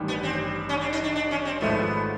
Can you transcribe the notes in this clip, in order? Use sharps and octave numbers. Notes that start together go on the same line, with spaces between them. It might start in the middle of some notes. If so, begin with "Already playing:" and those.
Already playing: A1 G2 D#3
B3
C4
C#4
D4
D#4
D4
D4
C#4
C4
G#1 G#2 F3 A3 B3